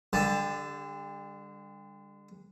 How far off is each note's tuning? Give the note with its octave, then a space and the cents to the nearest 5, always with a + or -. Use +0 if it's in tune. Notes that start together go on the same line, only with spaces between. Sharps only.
D3 +0 G3 +35 A5 +0